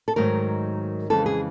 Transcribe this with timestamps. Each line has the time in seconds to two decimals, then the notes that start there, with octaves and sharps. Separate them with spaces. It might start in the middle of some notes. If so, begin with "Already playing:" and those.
0.08 A4
0.16 G#2 D#3 F#3 A3 A#4
1.10 F2 C#3 E3 G#3 A4
1.26 G#4